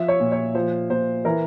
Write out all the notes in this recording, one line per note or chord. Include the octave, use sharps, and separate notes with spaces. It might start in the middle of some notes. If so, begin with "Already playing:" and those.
Already playing: F3 E5
C#5
A#2
C#5
F3 C5
A#2 C5
E3 A#4